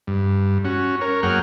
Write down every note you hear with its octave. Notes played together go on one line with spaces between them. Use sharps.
G2
C#4 F#4
A#4 C#5
F#2 A#3 G#4 F#5 G5 F6